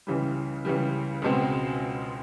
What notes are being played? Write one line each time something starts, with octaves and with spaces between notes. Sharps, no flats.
C#2 C#3 E3 G3
C#2 C#3 E3 G3
C#2 B2 G#3 C4